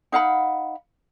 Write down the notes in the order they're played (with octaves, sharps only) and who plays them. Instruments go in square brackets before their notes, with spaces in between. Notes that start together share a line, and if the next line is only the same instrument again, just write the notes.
[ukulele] D#4 F5 F#5 B5